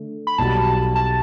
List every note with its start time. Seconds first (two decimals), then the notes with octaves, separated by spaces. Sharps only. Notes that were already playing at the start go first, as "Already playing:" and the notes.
Already playing: D3 A3
0.27 B5
0.38 B1 B2 G3 B3 F#4 A5
0.95 A5